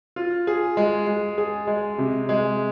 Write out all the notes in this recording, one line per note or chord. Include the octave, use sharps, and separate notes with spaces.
F4
G#4
G#3
G#3
G#4
G#3
C3
G#3